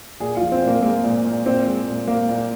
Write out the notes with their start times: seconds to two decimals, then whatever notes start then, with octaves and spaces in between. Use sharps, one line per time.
0.20 A#2 G#4
0.37 F3 F4
0.52 C4
0.62 A#2
0.67 A#3
0.82 G#3 A#3
1.04 A#2
1.24 A#2
1.46 A#2 C4
1.67 G#3
1.87 A#2
2.07 A#2 A#3
2.29 A#2